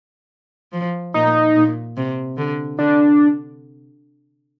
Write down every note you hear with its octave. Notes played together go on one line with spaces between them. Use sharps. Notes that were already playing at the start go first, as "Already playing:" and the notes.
F3
A#2 D#4
A#2
C3
D3
D3 D4